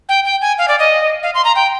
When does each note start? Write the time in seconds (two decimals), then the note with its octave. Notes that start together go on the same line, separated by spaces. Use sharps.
0.09 G5
0.25 G5
0.41 G#5
0.58 F5
0.68 D5
0.79 D#5
1.23 F5
1.34 C6
1.45 A#5
1.56 G5